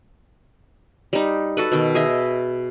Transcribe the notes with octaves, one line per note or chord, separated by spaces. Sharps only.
G3 D#4
F#4 A4 B4
B2 D#3
G#4 D#5 E5